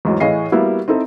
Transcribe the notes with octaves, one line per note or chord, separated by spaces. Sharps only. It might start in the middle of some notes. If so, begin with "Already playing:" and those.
E2 G#2 F#3
A2 E3 G#4 D#5 F5 C7
G3 A#3 B3 E4 F#4
C4 D#4 E4 A4